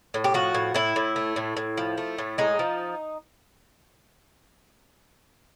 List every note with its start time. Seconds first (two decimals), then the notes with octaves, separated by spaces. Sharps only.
0.14 A2
0.24 G4
0.34 F3 F#4
0.54 A2
0.74 A2 E4
0.96 A2
1.16 A3
1.36 A2
1.57 A2
1.77 F3
1.98 A3
2.18 A2
2.38 G#3 D#4
2.59 F3